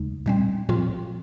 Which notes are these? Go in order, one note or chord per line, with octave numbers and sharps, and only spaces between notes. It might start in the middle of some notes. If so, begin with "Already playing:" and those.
Already playing: D#2 C#3 G#3 D#4
A#2 G3 C4
A#2 F3 C4 F4